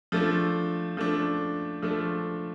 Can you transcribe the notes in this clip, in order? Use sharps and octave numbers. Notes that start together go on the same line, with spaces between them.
F3 A3 D4
F3 A3 D4
F3 A3 D4